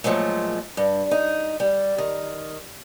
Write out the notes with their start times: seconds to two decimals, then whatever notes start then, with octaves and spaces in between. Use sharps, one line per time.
0.04 A#2 F3 F#3 G#3 A3
0.77 G2
1.11 D#4
1.60 G3
1.98 D#3